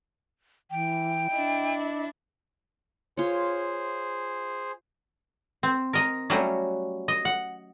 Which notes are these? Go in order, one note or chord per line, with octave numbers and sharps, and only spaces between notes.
E3 G5
D4 E4 D#5
F4 G#4 C5 C#5
C4
A#4 D#5 A#5
F#3 G3 A3 C#4 F#4
D#5
F#5